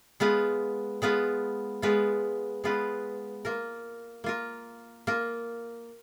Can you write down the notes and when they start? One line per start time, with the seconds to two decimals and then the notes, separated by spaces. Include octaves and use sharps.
0.20 G#3 B3 F4 B4
1.02 G#3 B3 F4 B4
1.82 G#3 B3 F4 B4
2.64 G#3 B3 F4 B4
3.45 A#3 F4 A#4
4.24 A#3 F4 A#4
5.07 A#3 F4 A#4